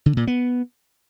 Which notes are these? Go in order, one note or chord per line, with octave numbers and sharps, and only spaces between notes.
D3
A#2
B3